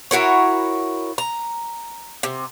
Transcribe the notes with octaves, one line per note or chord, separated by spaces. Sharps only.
E4 F#4 A#4 C#5
A#5
C3